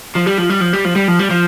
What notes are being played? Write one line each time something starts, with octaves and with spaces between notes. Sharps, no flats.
F3
G3
F3
G3
F3
G3
F3
G3
F3
G3
F3